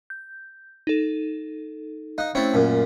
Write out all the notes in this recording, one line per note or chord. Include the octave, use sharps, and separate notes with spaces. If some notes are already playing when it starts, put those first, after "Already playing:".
G6
D#4 A4
D#4 F5 F#6
A3 C4 C#4 E4 C#5
F#2 A#2